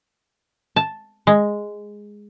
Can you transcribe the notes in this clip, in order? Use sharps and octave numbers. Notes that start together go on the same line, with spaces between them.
A5
G#3